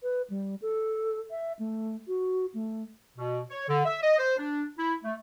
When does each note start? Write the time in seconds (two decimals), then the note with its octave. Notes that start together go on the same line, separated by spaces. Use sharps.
0.03 B4
0.30 G3
0.62 A4
1.31 E5
1.59 A3
2.08 F#4
2.54 A3
3.18 B2
3.50 C#5
3.69 D3
3.85 E5
4.03 D#5
4.18 C5
4.38 D4
4.78 E4
5.04 A3